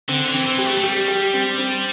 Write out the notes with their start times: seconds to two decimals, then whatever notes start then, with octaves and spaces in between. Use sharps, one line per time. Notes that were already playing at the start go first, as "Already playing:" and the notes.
0.09 D3 C4
0.27 E3
0.34 C4
0.46 E3
0.58 G4
0.65 A3
0.77 A3
0.83 G3 G4
1.08 G4
1.33 C4
1.58 C4